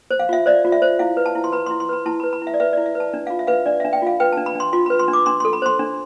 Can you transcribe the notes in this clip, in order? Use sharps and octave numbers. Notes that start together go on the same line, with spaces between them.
C5
F5
F4 E5
C5 D5
F4
E5
C5
E4 F5
B4
A5
E4
C6
B4 B5
E4 C6
C6
B4 B5
E4 A5
B4 B5
B5
E4
E5
D5
B4 E5
E4 D5
E5
B4
A5
D4
F4 F5
E5
B4 F5
E5
D4 D5
D4 E5
G5
F4 F5
B4 G5
D4 A5
B5
D4 C6
F4 C6
B4 B5
C6
D4
D6
D4 C6
A4 C6
B5
C5 C6
D4